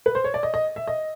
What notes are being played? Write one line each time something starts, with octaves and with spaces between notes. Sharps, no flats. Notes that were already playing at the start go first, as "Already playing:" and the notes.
B4
C5
C#5
D5
D#5
D#5
E5
D#5